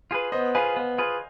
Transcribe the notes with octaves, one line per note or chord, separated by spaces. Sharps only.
F4 G#4 B4
B3 C5 D#5
F4 G#4 B4 F5 G#5
B3
F4 G#4 B4